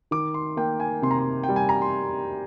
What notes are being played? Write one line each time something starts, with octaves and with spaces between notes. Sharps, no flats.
D#3 D6
C6
A#3 G5
G#5
C3 C6
A#5
C6
G5
G3
G#5
A#5
C6